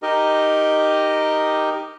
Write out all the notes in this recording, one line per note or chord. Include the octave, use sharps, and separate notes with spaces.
D#4 G4 A#4 D#5